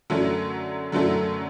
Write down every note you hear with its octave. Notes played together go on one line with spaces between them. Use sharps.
F#2 D3 F#3 A3 E4
F#2 D3 F#3 A3 E4